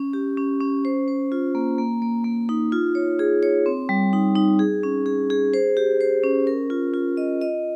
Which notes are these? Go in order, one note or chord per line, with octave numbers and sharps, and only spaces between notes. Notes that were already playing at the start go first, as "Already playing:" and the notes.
Already playing: C#4
G4
C#4
C#4
C5
C5
F4
A#3
A#3
A#3
A#3
D#4
F4
C#5
G#4
C#5
C4
G3
D#4
D#4
G#4
C#4
G#4
G#4
C5
G4
C5
C#4
A#4
F4
F4
D#5
D#5